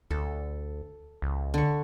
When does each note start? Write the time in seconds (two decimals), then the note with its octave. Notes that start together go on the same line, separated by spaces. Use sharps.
0.11 D2 A4
1.22 C#2
1.54 D3 C#6